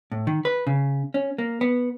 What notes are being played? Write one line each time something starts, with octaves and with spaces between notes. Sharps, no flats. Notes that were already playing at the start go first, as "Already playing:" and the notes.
A2
D#3
B4
C#3
C#4
A#3
B3